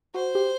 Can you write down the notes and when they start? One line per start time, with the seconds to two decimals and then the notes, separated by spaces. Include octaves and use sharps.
0.14 F#4 C5
0.35 G4